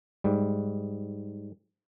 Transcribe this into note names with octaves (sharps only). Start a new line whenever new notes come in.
G#2 G3